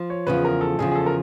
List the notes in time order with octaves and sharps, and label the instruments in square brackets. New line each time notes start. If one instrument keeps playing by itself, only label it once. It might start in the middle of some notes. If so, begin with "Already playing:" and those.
Already playing: [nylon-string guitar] F3
[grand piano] C#5
[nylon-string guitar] E2 C#3 F3 [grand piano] B4
[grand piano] A#4
A4
[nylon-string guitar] E2 C#3 F3 [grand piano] G#4
[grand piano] G#4
A4
A#4